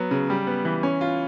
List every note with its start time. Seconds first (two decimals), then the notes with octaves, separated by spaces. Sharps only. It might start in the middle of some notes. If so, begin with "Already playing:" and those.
Already playing: F#3 B3
0.11 C#3
0.30 G3
0.47 B3
0.65 E3
0.83 C#4
1.01 F4